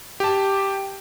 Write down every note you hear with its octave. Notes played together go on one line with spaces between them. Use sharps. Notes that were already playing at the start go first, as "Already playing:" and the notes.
G4 A5